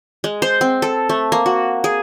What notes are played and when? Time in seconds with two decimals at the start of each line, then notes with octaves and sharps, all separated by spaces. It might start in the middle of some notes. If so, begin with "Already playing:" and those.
0.24 G#3
0.42 C5
0.61 C4
0.82 A4
1.09 A3
1.32 A#3
1.46 F#4
1.84 G#4